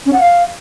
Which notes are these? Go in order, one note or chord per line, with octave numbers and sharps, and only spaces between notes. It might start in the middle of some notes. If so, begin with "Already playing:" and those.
C#4
F#5
F5